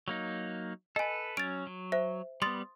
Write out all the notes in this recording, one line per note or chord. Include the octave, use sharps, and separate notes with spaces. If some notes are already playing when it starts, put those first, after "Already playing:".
F#3 A#3 D#4
A4 B4 D#5 G#5
F#3 C#4 A6 D7
F#3
C5 E5
G3 B3 C6 D#6 A6